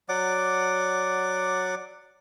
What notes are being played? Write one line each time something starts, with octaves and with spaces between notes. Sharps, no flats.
F#3 D5 F#5 D6